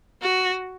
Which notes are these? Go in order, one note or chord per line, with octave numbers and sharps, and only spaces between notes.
F#4